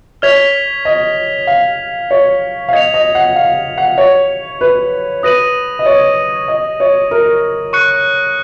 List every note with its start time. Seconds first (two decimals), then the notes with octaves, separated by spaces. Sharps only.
0.22 C#5 F6 G#6 B6 F7
0.85 D#5
1.47 F5
2.11 C#5
2.68 F5
2.73 D#5 G#6 C#7 F7
2.94 D#5
3.15 F#5
3.36 F5
3.78 F#5
3.98 C#5
4.61 B4
5.23 B4 D#6 A#6 D#7 F#7
5.79 D#5
5.86 C#5
6.48 D#5
6.80 C#5
7.11 A#4
7.73 C#6 F#6 C#7 F#7